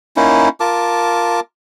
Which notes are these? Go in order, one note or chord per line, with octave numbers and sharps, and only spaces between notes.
A#3 C#4 D#4 E4
F4 A#4 A5 D6